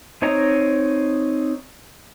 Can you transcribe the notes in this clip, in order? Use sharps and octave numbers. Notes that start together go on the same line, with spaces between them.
C4 D#4 C#5 D#5 A#5